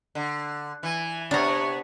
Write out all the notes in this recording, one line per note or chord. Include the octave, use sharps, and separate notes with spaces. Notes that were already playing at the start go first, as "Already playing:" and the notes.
D3
E3 G#5
C3 B3 D4 C#5 A#5